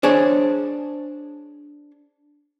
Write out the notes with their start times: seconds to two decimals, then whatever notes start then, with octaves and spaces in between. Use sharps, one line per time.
0.03 D4 G#4 C5 C#5